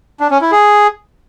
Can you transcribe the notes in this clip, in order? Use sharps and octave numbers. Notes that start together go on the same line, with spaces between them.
D4
C#4
E4
G#4